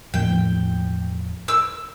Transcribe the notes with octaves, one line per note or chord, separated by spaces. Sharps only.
E1 A2 F3 G5
E6